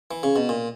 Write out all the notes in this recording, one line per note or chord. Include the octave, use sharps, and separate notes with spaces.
E3
C#3
B2
A#2